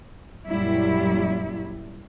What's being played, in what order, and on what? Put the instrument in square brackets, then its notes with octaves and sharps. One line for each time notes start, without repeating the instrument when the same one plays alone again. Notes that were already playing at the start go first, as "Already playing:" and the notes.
[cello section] F#2 A#2 F#3 G3 E4